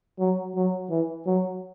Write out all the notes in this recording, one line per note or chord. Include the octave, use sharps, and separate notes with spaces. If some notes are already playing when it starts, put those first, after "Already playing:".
F#3
F#3
E3
F#3